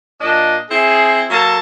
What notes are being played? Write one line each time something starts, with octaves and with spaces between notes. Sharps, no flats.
A#2 D4 D#5
C4 E4 G#4
F#3 A#3 A4 A5